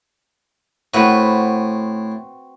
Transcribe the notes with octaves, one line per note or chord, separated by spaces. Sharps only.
A2 C4 F#4 B4